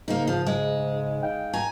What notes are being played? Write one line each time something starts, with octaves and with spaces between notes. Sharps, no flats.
G#2 C#3 A#3 D#4
F3
G#3
D#4 F5 G5
G#5 A#5